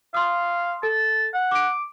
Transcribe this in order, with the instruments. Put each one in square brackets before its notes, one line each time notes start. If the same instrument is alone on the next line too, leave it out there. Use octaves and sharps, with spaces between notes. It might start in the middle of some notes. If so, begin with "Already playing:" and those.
[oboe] F5 [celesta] C6 D#6
[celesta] A4 [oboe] A5
[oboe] F#5
[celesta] D6 D7